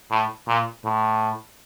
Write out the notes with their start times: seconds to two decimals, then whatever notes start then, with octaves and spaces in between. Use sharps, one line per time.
0.11 A2
0.48 A#2
0.85 A2